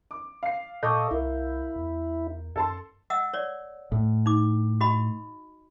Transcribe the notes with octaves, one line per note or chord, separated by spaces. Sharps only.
D6
F5 C7
A#2 A4 D#5 C#6 D6 G6
C2 E4 A#4
E2
F#2 A4 A5 C6
D#5 F#5 E6
C#5 D5
A2
D#4 D6
F#4 D#5 B5